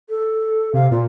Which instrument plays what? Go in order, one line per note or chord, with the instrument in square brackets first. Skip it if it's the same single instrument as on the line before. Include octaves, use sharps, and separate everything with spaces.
[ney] A4
[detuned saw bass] C3 [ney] F5
[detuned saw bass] A#2 [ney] F4